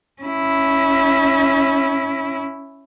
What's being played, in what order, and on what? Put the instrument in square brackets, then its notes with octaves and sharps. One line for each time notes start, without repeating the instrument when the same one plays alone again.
[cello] C#4 E4